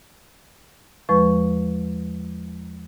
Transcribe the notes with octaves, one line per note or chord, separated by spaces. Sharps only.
E2 F3 G#3 B4 C#6